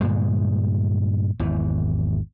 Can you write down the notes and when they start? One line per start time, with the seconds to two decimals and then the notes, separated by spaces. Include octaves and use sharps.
0.01 G2 A#2 D3 G#3
1.39 G#1 E2 E3